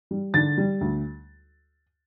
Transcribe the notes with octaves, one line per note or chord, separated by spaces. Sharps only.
G3
D3 A6
G3
D2